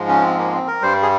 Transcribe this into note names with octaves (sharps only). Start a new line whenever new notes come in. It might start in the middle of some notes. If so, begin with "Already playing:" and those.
Already playing: G#2 F3 G#3
C#4
C4
A#3
C4
A#4
G2 G3 C5
G#4